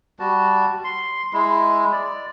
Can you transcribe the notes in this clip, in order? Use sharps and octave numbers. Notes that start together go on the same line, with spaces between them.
G3 F#4 A5
C6
G#3 E4
D5